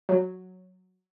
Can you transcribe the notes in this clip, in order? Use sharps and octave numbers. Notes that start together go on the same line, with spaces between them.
F#3